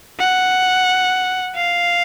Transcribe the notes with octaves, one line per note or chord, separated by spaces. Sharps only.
F#5
F5